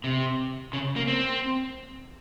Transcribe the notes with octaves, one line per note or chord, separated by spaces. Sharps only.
C3
C#3
A#3
C4